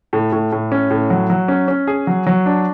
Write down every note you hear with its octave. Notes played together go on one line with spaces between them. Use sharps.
A2
A2
A2
C#4
A2
F#3
F#3
C#4
C#4
G#4
F#3
F#3
D4